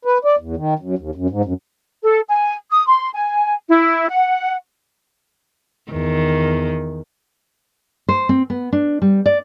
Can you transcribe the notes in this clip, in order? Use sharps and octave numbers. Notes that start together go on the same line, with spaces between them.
B4
D5
E2
D#3
F#2
D#2
F#2
G#2
F#2
A4
G#5
D#6
C6
G#5
E4
F#5
E2 D#3
C5
C4
B3
D4
G3
D5